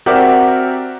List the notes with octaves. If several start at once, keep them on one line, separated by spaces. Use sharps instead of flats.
C4 F#4 G4 A#4 D5 E5